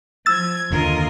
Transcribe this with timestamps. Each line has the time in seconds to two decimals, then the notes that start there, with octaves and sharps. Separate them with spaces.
0.26 F3 E6 G#6 A6
0.71 F#1 D#2 D3 F4 A#4 D#5